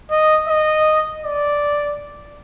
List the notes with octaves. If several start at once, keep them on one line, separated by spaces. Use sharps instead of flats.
D#5
D#5
D5